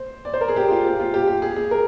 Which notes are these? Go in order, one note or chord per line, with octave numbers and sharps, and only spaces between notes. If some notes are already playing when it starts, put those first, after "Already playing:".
Already playing: C5
D5
C5
A#4
G#4
G4
F4
G4
F4
G4
G4
G#4
G#4
A#4